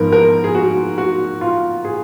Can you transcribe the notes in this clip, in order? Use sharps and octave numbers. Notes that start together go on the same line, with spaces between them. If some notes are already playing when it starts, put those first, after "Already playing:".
Already playing: G#2 F3 B3 A#4
A#4
G#4
F#4
F#4
F4
G#4